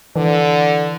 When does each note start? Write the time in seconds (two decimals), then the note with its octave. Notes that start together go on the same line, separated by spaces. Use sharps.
0.16 D3 E3